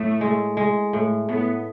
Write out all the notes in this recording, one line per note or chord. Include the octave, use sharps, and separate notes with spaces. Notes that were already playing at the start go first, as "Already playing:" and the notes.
Already playing: A2 A3
G#3
G#3
A2
A2 B3